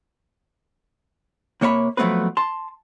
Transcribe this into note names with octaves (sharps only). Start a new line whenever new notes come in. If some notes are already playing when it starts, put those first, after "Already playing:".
C3 A#3 C#5 E5 B5
F3 F#3 A3 B3 C4 B4
A5 C6